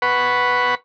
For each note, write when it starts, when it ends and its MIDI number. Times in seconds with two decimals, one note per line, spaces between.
0.02 0.75 71
0.02 0.75 78
0.02 0.75 83
0.02 0.75 85